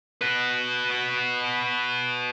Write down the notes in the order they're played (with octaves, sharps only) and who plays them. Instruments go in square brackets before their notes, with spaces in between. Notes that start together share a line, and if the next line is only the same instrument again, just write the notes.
[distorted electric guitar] F#4 B4